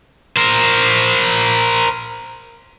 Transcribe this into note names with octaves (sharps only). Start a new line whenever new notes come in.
A#4 C5